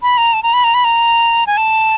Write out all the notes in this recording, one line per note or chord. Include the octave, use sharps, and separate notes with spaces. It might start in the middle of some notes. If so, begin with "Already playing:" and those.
B5
A#5
A5
A#5
B5
A#5
B5
A#5
G#5
A5